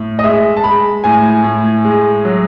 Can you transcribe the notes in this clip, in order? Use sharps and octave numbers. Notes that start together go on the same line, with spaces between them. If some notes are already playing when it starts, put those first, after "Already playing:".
Already playing: A2
D#5
G#3 E5
A5
G#3 B5
A2 G#5
A2
G#3
F#3